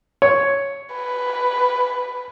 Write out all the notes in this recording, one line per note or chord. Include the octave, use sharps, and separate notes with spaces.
C#5
B4